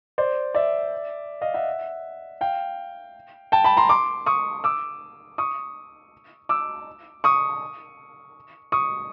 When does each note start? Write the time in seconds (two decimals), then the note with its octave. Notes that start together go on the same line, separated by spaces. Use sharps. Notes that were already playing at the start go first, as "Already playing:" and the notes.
0.18 C5 D5
0.55 D5 E5
1.41 D#5 F5
1.54 E5 F#5
2.41 F5 G5
3.52 G5 A5
3.64 A5 B5
3.77 A#5 C6
3.89 C6 D6
4.26 C#6 D#6
4.64 D6 E6
5.38 C#6 D#6
6.49 D6 E6
7.24 C#6 D#6
8.72 C#6 D#6